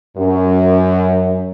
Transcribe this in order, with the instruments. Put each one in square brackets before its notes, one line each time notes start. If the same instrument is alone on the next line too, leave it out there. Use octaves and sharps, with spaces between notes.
[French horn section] F#2